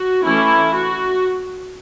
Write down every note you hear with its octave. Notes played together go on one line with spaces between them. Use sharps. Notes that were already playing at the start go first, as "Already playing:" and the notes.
Already playing: F#4
E3 A3 C#4 E4
F#4